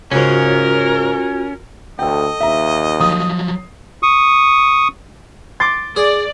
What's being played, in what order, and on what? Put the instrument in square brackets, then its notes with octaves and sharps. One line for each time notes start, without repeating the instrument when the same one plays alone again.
[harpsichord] G#2 C#3 [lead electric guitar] C#4 [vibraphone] F4 F#4 [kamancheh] A#4
[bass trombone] D2 [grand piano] A4 G5 [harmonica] D#5
[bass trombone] D#2 [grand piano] E5 A#5
[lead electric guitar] F3 F#3 [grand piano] D#6
[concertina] C#6 D#6
[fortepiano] C6 D6 [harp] A6
[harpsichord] G#4 [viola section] D5